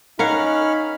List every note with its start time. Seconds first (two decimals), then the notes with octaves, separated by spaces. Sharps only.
0.19 C#4 D#4 A#4 F5 F#5 B5 F6